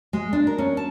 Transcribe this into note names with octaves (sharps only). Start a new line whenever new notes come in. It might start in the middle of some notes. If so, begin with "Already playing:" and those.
G#3
D4
A#4
C#4
A5